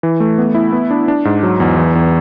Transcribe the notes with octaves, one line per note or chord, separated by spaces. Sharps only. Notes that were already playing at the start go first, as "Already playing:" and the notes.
E3
A3
B3
E4
B3
D4
D4
G#2
F#3
E2
E3
E2